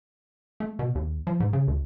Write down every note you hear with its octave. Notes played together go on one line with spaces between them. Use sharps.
A3
B2
D#2
F3
G#2
C#3
D2